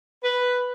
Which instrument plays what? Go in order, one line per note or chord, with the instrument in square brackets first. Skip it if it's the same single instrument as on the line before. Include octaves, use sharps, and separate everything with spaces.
[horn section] B4